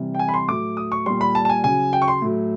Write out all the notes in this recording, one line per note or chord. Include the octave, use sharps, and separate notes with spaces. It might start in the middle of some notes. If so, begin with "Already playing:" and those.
Already playing: C3 E3 G3
G5
G#5
B5
C6
A2 F#3 D6
D#6
C#6
A#2 G3 C6
B5
A5
A5
G#5
C#3 F#3 G#5
G5
C#6
C6
A2 F#3